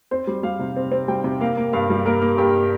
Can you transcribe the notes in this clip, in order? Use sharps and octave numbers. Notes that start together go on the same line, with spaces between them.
C4 C5
G3
G3 F5
C3
C4
C4
G3 G5
C3
A#3 F5
A#3
G2 F5
G3
A#3 A#4
A#3
G2 G4